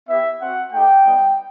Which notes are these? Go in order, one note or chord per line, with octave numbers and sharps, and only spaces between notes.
B3 E4 G4 E5
C4 F#4 F#5
A3 D#4 G4 G5
G3 B3 D#4